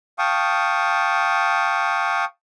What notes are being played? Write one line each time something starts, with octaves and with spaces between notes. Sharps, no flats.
F5 G5 A5 C#6 D#6